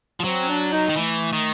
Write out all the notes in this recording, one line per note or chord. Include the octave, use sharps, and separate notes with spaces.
F3
F#3 C4
C#4
D4
D#4
D#3
E3 A3
D#3